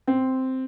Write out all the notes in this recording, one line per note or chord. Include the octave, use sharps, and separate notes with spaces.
C4